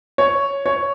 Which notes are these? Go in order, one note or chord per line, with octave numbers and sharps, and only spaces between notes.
C#5
C#5